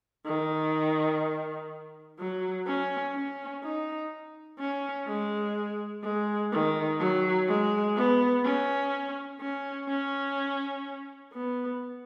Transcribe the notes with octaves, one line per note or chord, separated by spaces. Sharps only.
D#3
F#3
C#4
C#4
D#4
C#4
G#3
G#3
D#3
F#3
G#3
B3
C#4
C#4
C#4
B3